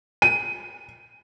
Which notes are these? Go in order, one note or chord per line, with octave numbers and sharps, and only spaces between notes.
D#7